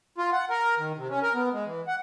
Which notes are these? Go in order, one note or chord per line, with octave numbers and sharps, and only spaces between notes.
F4
F#5
A#4
D#3
C3
C#4
A#4
B3
G#3
E3
F#5